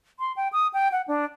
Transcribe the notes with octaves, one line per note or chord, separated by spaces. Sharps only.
C6
G5
D#6
G5
F#5
D4